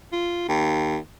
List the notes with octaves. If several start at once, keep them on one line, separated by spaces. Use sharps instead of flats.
F4
D#2